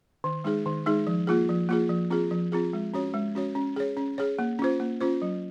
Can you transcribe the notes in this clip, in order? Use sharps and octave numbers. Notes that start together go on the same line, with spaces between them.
D#3
G#3 D#4 G#4
D#3
G#3 D#4 G#4
F3
A#3 F4 G#4
F3
A#3 F4 G#4
F3
C4 F4 G#4
F3
C4 F4 G#4
G#3
C#4 F#4 C#5
G#3
C#4 F#4 C#5
C#4
G#4 C#5
C#4
G#4 C#5
A#3
C#4 F4 C5
A#3
C#4 F4 C5
F#3